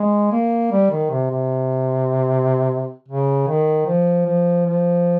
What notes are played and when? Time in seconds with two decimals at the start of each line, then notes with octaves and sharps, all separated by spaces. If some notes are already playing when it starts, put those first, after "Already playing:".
Already playing: G#3
0.32 A#3
0.72 G3
0.91 D#3
1.10 C3
1.31 C3
3.08 C#3
3.48 D#3
3.86 F3
4.26 F3
4.66 F3